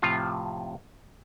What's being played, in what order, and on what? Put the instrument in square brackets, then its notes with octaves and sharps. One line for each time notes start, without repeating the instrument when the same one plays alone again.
[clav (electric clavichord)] A2 C3 F3 F4